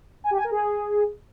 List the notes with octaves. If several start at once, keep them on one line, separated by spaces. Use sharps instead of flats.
G#5
G4
G#5
A#4
G#4